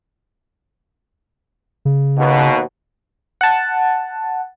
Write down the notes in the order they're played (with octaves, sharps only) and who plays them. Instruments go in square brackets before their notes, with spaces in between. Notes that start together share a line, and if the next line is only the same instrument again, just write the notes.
[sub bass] C#3
[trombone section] D#2 B2
[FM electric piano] F#5 A5